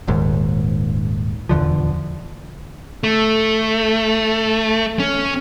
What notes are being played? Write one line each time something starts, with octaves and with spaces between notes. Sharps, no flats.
D#1 D#2 G#2
D#1 E2 D3 F3
A3
C#4